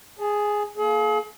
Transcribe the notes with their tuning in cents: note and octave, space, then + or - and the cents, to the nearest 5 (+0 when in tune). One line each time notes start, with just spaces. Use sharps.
G#4 +0 A5 -30
A#3 +0 G#4 +40